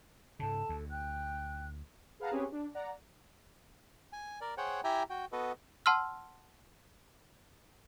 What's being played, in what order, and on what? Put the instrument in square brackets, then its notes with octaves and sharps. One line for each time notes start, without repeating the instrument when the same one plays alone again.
[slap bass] G#2 C#3 [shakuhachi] A4 [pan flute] A5
[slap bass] D2
[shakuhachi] G5 [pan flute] F#6
[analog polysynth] G#4 B4 F5 F#5 A5 A#5
C4 C#4 G4 G#4 B4 C#5
D4
D5 F#5 A#5
[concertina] G#5
A#4 D5
G#4 C5 C#5 F#5 G5
E4 G4 E5 G5 G#5 A#5
F#4 G5
B3 F#4 A4 B4 D#5
[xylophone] F#5 A5 C6 E6 F6